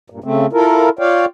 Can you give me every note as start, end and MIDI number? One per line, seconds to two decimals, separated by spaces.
0.10 0.19 43
0.10 0.19 46
0.24 0.46 49
0.24 0.46 57
0.24 0.46 60
0.53 0.89 64
0.53 0.89 65
0.53 0.89 69
0.53 0.89 70
0.99 1.25 65
0.99 1.25 73
0.99 1.25 74
0.99 1.25 77
0.99 1.25 79